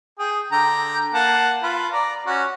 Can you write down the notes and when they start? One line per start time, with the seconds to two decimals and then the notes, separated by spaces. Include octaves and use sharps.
0.19 G#4 G5
0.52 D3 G5 A#5
1.14 A#3 F#5 A5
1.63 F4 B4
1.93 D5 A#5
2.27 C#4 F#4